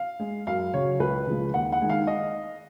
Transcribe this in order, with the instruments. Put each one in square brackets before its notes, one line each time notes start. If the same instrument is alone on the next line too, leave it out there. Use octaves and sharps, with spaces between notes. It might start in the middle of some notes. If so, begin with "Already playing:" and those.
Already playing: [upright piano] F5
G#3
F#2 F5
C#3 F#3 C#5
C#2 B4
C#3 F3 G#3
D#2 F#5
F#5
D#3 G#3
F5
D#5